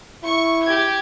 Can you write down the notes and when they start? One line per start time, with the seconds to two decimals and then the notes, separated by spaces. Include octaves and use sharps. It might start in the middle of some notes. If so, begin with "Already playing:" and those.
0.23 E4 C#6
0.63 G4 G#6